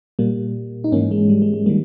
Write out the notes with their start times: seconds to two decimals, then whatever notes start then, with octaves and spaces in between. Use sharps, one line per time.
0.19 A#2 G3 A#3
0.84 D#4
0.92 G#2 E3 A#3 C#4
1.11 G#3
1.29 G3
1.42 G#3
1.54 G#3
1.66 D#3 G3 A#3